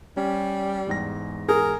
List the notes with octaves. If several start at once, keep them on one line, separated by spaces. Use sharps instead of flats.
G3 C#4
E2 G#2 A#6
G#4 A#4